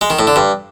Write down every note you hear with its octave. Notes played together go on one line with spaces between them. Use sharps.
G#3
D#3
A2
D3
G2